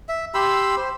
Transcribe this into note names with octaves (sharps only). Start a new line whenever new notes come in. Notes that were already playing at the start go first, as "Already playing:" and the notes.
E5
G4 B5 C6 E6
C5